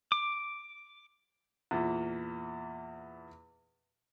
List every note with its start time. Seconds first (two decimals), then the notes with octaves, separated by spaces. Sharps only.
0.12 D6
1.71 E2 A#2